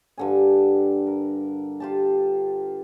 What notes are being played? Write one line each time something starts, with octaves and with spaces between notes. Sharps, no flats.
G2 D3 G#5
A#4
F4 G4 A5